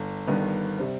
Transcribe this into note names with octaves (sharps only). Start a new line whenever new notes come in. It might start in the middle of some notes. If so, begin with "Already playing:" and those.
Already playing: G1
G1 G2 D#3 B3
C3 G3 C4